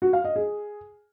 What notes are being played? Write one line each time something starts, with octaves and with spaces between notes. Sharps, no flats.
F#4
F5
D#5
G#4